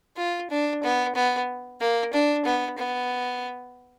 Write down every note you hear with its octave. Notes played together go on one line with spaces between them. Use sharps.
F4
D4
B3
B3
A#3
D4
B3
B3